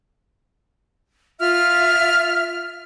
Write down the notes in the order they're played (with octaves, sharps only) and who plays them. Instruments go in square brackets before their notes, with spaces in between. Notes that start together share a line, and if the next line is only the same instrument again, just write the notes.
[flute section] F4 E5 F6